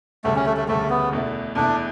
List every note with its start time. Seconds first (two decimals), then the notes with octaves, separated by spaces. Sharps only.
0.24 E1 D2 C#3 G3 A3
0.36 C#4
0.46 A3
0.57 A3
0.68 E1 D2 C#3 G3 A3
0.90 B3
1.12 E2 B2 A3 E4
1.55 E2 B2 A3 D4 E4